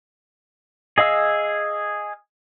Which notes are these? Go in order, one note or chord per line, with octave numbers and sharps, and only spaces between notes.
G#4 D#5 F5 E6